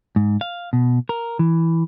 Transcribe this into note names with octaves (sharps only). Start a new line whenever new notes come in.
G#2
F5
B2
A#4
E3